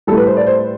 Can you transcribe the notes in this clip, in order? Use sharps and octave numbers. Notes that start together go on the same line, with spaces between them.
A2 G3 A4
B4
C5
D5
C5